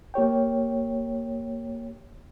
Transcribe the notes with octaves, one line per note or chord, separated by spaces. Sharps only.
A#3 G4 C#5 G5